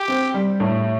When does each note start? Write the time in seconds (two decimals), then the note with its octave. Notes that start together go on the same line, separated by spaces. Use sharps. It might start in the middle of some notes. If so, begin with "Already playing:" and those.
Already playing: G4
0.08 C4
0.34 G3
0.60 A2